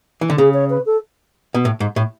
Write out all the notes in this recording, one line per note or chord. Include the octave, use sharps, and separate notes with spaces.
E3
D3
C#3 G#4
C#5
B4
A4
B2
A2
G#2
A2